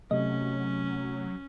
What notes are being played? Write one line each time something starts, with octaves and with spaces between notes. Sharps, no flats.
C3 F#3 A3 C#4 D#5